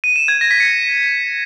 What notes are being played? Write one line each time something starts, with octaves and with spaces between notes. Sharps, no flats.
D#7
E7
G#6
A#6
B6
C#7